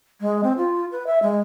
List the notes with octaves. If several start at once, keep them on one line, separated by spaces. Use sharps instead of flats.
G#3
C4
F4
B4
E5
G#3